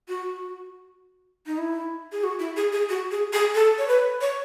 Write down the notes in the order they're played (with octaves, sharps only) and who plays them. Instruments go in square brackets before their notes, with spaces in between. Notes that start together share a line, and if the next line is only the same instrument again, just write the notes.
[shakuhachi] F#4
D#4
E4
G#4
F#4
E4
G#4
G#4
F#4
G#4
G#4
A4
C#5
B4
C#5